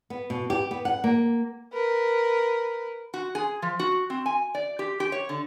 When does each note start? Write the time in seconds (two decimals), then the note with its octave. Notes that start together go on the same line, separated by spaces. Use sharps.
0.10 B3
0.30 B2
0.50 G4
0.71 B3
0.85 F#5
1.04 A#3
1.73 A#4 B4
3.14 F#4
3.35 G#4
3.62 F3
3.80 F#4
4.10 C4
4.26 G#5
4.55 D5
4.79 G4
5.00 G4
5.12 C#5
5.29 D3